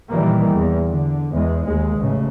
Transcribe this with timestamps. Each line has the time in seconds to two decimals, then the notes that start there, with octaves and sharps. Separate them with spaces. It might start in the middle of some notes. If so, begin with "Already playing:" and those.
0.10 A#2 D#3 E3 G3 A#3
0.50 E2
0.86 D3
1.33 E2 G#3
1.66 D#2 G#3
1.98 A1 C#3